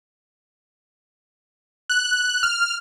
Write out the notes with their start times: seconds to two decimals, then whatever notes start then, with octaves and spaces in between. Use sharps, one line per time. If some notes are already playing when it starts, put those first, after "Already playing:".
1.90 F#6
2.43 F6